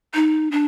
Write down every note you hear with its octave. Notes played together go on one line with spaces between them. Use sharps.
D#4
D4